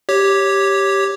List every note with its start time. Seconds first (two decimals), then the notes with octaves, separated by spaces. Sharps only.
0.09 G4 C#5